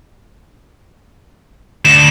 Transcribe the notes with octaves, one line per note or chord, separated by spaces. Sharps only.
D2 E7